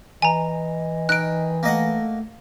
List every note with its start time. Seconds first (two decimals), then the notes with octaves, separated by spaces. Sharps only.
0.22 E3 D#5 G#5 A#5
1.09 D#3 F#6 D7
1.63 A3 A#3 D#5 F#5